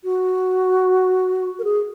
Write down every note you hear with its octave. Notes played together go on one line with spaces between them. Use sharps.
F#4
A#4
G#4